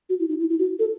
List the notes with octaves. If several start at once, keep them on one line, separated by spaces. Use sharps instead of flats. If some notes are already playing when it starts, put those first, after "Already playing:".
F#4
E4
D#4
E4
E4
F#4
A4